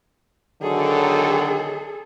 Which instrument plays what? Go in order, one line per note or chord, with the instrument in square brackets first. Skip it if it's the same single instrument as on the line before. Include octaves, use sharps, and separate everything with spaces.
[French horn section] D3 D#3 F#3 [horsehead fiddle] G#4 A4